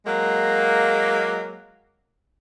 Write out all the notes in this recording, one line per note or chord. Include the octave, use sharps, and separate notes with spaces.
F#3 G#3 A#3